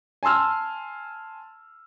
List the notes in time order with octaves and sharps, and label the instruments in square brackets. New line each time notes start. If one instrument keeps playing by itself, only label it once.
[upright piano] G#5 A5 C6 E6 F6